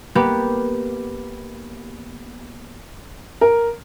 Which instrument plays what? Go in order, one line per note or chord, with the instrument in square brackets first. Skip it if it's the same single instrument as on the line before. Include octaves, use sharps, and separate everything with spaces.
[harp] A#3 B3 G4
[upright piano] A#4